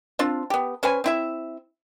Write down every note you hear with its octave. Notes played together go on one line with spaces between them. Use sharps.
C4 D4 F4
B3 G4
C#4 B4 C5 G#5
C4 E4 E5